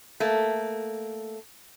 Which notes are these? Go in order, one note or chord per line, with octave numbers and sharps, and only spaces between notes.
A3 A#3